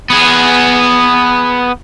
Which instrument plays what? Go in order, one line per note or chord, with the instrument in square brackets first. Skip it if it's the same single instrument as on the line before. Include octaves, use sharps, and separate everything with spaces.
[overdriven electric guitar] B3 G#4